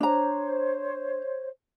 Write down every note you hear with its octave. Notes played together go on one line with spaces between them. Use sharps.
D4 C5 C#5 A#5